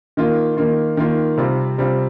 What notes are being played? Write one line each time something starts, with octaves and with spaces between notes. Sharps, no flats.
D#3 A#3 F4
D#3 A#3 F4
D#3 A#3 F4
C3 G3 C4 F4
C3 G3 C4 F4